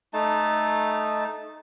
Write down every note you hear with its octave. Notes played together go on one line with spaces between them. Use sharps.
A3 D#4 A5